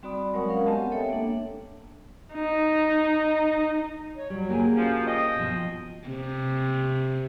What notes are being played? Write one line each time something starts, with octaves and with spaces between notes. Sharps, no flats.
G3 C4 F#4 D5 B5 D#6
F#3 G#3 A#4 C#5 F#5 C#6
G#3 C#4 A#4 F5 F#5
G#3 B3 C4 G4 D#5 A5
A4 C#5 E5 G5
A#3 D4
D#4
C#5
F#3 G3
A#3 G4 G#4
F3 C#4
D#5 G5
B2 F3
C3